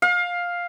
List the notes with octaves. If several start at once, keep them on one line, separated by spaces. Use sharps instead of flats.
F5